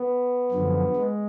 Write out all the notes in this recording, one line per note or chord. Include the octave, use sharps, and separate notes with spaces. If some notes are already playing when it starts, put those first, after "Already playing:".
Already playing: B3
F#2 D3 F3
G#3